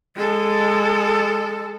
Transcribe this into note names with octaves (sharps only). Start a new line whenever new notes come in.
G#3 A4